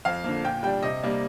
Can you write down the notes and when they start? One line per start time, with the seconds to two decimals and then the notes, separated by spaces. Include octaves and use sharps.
0.05 F2 F5
0.24 D3 F3 A#3
0.45 A#2 G5
0.63 G3 D4 G5
0.83 C3 D#5
1.03 G3 A#3 D4